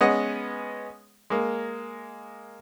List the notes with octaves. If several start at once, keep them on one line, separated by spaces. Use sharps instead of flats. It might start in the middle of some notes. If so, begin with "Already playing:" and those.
G#3 B3 C#4 D#5 F#5
G#3 A#3